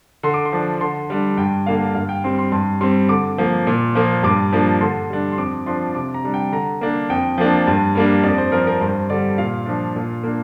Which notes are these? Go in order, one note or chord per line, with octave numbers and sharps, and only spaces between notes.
D3 C6
D6
C6
F3 D4
D3 C6
G3 D4
G2 G5
D3 A#3 D4 F5
G2 F5
G5
G3 C4 C6
C6
G2 C6
G3 C4 C6
D3 D6
F3 A#3
A#2
F3 A#3
G2 D6
F3 A#3 D4
D3 C6
G3 D4
C6
F2 D6
F3 D4 C6
C3 D6
A#5
G3 D4
G5
D3 A#5
A#3 D4
F2 G5
F3 A#3 D4
G2
G3 A#3 D4
F2 D5
C5
F3 C4 A#4
A#4
G2 C5
D3 G3 D5
A#2 F5
F3 D4
A#2
A#3 D4